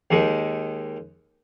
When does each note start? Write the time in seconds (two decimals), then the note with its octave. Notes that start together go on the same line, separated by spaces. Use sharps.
0.11 D#2 D#3 G#3